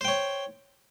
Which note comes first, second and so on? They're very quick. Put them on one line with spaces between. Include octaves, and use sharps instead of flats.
C5 G5 C#5